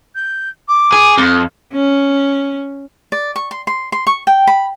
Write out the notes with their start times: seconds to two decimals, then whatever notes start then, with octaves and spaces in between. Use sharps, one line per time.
0.15 G6
0.68 D6
0.93 G#4
1.18 F2
1.74 C#4
3.12 D5
3.36 C#6
3.51 C6
3.67 C6
3.92 C6
4.07 C#6
4.27 G5
4.47 B5